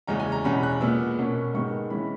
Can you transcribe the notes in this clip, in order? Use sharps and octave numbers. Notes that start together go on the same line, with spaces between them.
E2 C#3 G#3 C#4 A#5
G#5
A#5
E2 B2 G#3 C#4 B5
F#6
A#2 G#3 B3 E6
B2 A#3 C#4
G#2 D#3 G#3 B3 C#6
E3 G#3 C#4 B5